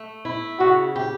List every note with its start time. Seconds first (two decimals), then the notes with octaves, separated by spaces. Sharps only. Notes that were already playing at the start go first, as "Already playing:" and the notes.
Already playing: A3
0.25 E4
0.60 C#3 F#4
0.96 G4